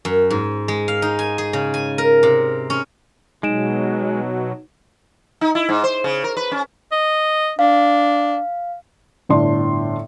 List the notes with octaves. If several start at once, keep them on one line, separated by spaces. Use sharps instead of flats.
F#2
G#2
G#3
F5
D#4
G#5
G#4
C#3
G#5
A#4
C3
C#4
B2 F#3 G#3 D#4 D7 E7
D#4
E4
G#2
C5
C#3
A#4
B4
C#4
D#5
D4 F5
G1 A2 D4 D5 C6